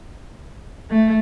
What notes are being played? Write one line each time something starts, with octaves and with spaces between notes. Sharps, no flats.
A3